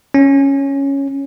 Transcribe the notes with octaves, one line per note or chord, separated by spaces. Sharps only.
C#4